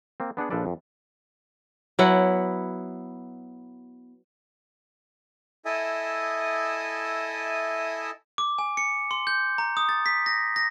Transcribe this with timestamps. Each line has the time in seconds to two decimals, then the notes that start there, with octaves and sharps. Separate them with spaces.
0.20 A#3 C4
0.37 B3 D4 G#4 F#5
0.50 A#1 F3 D4 A4 B4 D5
0.66 F2
1.99 F#3 B3 E4 F#5
5.65 E4 A4 D#5 E5 G#5 D#6
8.38 D6
8.58 G#5
8.77 C#7
9.11 C6
9.27 G6
9.58 A#5
9.77 D#6
9.89 A6
10.06 B6
10.26 A#6
10.56 A#6